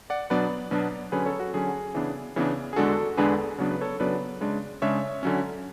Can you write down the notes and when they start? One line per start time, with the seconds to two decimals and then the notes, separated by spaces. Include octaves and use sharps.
0.10 D5 F#5
0.30 B2 F#3 B3 D4 B4 D5
0.71 B2 F#3 B3 D4
1.12 D3 F#3 C#4 G#4 B4
1.26 A4 C#5
1.40 F#4
1.54 D3 F#3 C#4 G#4
1.94 C#3 E3 B3 D4
2.36 C#3 E3 B3 D4
2.73 G#4
2.76 E2 D3 G#3 D4 F#4 A4
3.17 E2 D3 G#3 D4 G#4 B4
3.58 C#3 F#3 B3 D4 C#5
3.71 B4
3.81 A4 C#5
4.00 C#3 F#3 B3 D4 B4 D5
4.41 C#3 G#3 D4
4.82 C#3 G#3 D4 C#5 E5
5.23 D3 F#3 C#4